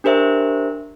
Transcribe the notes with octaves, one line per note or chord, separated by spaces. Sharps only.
D4 G4 A#4 C5 E5